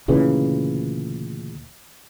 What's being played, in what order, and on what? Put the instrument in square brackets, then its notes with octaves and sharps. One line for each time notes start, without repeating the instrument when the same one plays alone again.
[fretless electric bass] D2 A#2 C#3 E3